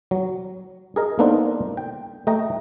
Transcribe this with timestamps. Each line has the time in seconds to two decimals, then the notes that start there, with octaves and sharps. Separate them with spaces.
0.11 F#3
0.96 G#4 A#4 D#5
1.19 A#3 B3 D4 D#4 A4 C5
1.77 G5
2.27 A3 D#5 G5 A#5